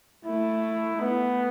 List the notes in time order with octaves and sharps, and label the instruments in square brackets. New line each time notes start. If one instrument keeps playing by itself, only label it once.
[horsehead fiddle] A3 [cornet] E4
[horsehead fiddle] A3 [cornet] B3